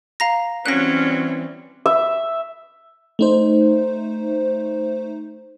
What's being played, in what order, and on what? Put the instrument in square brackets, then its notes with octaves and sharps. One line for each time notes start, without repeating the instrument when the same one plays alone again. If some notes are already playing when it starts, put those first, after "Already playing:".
[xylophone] F5 A#5 A#6
[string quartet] E3 G3 C4 [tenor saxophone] F#3 [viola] C#4 [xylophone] F#6 A#6
[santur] E5
[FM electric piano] A3 D#4 C5